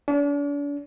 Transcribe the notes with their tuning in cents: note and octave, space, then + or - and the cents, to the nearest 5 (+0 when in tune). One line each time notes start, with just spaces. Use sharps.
D4 -40